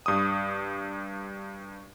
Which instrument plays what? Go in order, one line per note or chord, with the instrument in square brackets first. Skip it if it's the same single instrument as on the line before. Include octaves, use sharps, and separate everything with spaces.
[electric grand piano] G2 D#6